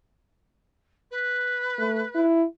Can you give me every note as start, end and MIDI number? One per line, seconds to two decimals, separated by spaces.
1.10 2.23 71
1.79 2.03 57
2.15 2.45 64